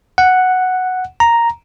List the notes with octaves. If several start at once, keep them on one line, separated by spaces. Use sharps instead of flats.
F#5
A#5